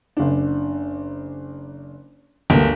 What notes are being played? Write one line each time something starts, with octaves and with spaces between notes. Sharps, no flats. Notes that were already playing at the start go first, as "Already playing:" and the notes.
F#1 D4
G1 D2 A3 A#3